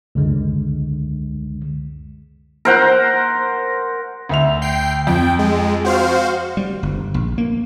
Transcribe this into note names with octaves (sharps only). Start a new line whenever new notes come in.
C#2 F#2 D3 G#3
A#4 C5 F#5
D2 E5 F7
G5 C7
F2 G5
G#3
F#4 C5 F5
G3
G1
A#1
A#3